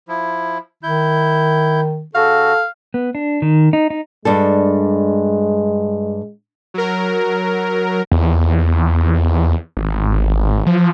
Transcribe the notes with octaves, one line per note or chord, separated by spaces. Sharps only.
F3 E4
D#3 E4 G6
C#3 F#4 A4 F5
B3
D4
D#3
D#4
D#4
G2 G#3 D4 A4
F#3 A#4
E2
G#1
F3